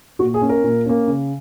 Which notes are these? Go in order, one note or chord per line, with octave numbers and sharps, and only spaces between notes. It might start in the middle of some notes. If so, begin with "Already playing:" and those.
A#2 F#4
G#4
A#3 C#4
A#4
A#2
A#3 C#4
C#3